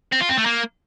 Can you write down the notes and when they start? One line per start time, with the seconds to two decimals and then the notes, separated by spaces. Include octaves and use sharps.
0.12 C4
0.21 F4
0.29 C4
0.38 A3
0.46 A#3